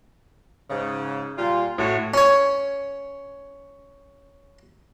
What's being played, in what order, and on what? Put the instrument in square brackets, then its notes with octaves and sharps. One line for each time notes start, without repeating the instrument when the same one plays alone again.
[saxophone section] G#2 C#3
A#2 G3 F4
[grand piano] A2 [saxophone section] F#4 C#5
[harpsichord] C#4 C#5